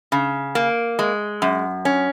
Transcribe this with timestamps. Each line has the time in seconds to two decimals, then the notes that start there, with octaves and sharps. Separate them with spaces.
0.12 C#3
0.55 A#3
0.99 G#3
1.42 F#2
1.85 C#4